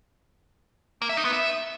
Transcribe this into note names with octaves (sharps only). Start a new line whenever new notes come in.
A#3
E5
D#4
B3
E5